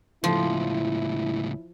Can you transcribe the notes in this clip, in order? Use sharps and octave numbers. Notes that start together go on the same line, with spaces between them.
C#2 A2 F3 E4